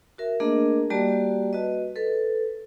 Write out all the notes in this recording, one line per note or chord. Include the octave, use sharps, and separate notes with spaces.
F#4 A#4 E5
A3 A#3 D4 G#4 A#4 D#5
G3 A#3 F#4 G4 D5 A5
F#4 B4 D#5
A4 B4